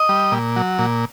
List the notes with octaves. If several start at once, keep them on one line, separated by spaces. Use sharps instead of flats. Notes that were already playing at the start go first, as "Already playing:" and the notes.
Already playing: D#5
G3
A#2
F#3
A#2